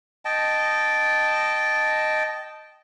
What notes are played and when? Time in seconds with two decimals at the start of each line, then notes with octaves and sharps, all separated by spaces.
0.25 D#5 G5 A5